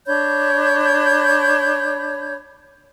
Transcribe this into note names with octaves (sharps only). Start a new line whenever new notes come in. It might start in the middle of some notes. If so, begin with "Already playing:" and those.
D4 C#5 B5 G6